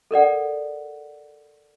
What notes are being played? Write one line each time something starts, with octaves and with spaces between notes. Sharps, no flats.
A4 A#4 D5 F#5